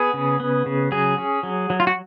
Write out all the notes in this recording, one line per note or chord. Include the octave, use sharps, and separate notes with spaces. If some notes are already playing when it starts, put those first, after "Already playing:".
Already playing: B3 G#4
C#3
B3
C#3
F#3 G#4
C#4
F#3
F#3
F4
F#4